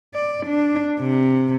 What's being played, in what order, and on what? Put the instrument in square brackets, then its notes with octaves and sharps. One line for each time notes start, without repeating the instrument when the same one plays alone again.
[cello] D5
D4
C3